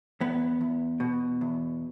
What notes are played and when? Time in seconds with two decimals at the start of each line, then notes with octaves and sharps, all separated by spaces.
0.20 E2 B3
0.61 E2
1.00 B2
1.41 E2